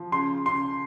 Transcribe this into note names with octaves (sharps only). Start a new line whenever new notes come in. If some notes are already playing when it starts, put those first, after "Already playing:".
Already playing: F3
C#3 C6
C#3 C6